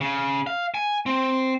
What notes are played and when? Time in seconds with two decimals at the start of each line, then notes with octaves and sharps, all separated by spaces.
0.01 C#3
0.47 F5
0.74 G#5
1.06 C4